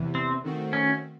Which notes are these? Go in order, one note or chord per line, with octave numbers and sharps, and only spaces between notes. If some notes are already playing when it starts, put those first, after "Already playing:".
Already playing: E2 C3 E3
C4
D#3 A3 C4 F#4
C#4